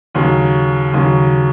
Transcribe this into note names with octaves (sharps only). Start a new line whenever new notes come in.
D#2 C#3 F#3
D#2 C#3 F#3